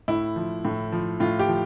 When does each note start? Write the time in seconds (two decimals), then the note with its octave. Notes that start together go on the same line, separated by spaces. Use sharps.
0.08 A2 E4
0.36 F3
0.65 A2
0.92 F3
1.20 A2 F4
1.39 G4
1.49 F3